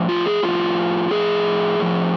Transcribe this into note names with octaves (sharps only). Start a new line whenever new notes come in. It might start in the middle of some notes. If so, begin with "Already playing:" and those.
Already playing: A2 F3
F4
G#4
A2 F3 F4
A2 F3 G#4
A2 F3